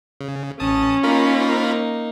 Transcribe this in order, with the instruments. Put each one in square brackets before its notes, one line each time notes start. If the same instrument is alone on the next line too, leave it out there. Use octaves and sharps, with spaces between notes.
[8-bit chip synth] C#3
[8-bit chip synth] A1 A5 D#6 [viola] C#4
[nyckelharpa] A#3 D#4 [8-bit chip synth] F4 A#4 B5